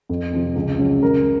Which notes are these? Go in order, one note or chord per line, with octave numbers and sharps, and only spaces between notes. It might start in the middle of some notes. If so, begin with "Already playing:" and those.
F2
C3 F3 C4
C#2
C#3 F#3 C#4
C#2 A#4